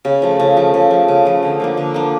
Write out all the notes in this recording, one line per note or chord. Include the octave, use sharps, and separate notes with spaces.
C#3
F3 A3
C#3
F3 A3
C#3
F3 A3
C#3
F3 A3
D3
F3 A#3 D4
D3
F3 A#3 D4